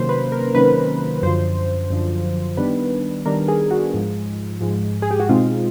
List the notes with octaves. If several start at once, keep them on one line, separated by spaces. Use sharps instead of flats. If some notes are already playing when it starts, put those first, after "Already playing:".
Already playing: C3 D#3 F#3 A#3 C#4 C5
B4
A#4
C3 D#3 F#3 A#3 C#4 B4
F#2 D3 F3 C5
F#2 D3 F3
D#3 G3 B3 D4 B4
D#3 G3 B3 D4 A#4
G#4
F#4
G#2 F3 G#3
G#2 F3 G#3
G#4
G4
F#4
B2 G#3 C4 D#4 F4